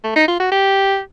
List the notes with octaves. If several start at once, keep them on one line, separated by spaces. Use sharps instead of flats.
A3
D#4
F4
F#4
G4